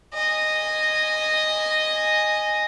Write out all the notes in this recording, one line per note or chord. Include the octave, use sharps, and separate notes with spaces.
D#5 G#5